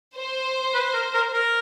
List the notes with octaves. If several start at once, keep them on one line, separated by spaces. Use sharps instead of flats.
C5
B4
A#4
A#4
A#4